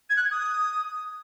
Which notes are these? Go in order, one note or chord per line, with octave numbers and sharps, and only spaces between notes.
G#6
F#6
G#6
D#6